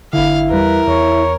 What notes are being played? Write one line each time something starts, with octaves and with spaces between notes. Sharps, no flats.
G1 D3 E4 F5
E2 G3 A#4 B4
E2 C#5